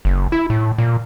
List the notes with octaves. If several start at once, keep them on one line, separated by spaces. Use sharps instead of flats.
F#1
E4
A2
A#2